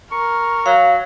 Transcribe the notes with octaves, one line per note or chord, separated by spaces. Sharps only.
A#4 C#6
F#3 F5